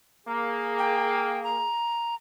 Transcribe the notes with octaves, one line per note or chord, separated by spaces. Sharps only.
A#3 G#4
G5
A#5